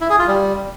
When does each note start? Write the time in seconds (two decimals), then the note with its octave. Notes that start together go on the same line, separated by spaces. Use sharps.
0.01 E4
0.10 G#4
0.19 F4
0.28 G3